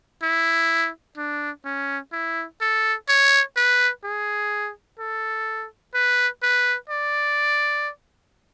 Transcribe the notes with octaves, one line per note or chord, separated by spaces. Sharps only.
E4
D4
C#4
E4
A4
C#5
B4
G#4
A4
B4
B4
D5